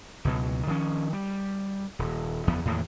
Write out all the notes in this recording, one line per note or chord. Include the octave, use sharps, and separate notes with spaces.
C#2 B2 F#3
D#3 F3 C#4
G3
D#1
F#1 E2 F3 B3
E2 A2 D#3 A#3